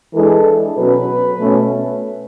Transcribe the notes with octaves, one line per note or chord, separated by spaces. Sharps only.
E3 G#3 D4 A4
B2 F#3 C#4 B4
B2 A3 C#4